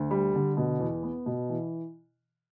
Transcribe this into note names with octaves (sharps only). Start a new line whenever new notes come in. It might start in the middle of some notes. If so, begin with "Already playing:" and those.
Already playing: D2
G3
D3
B2
E2
B3
B2
E3